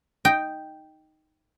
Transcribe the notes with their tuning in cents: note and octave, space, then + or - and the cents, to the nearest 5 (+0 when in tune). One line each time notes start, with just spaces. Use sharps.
D#4 +0 G5 +0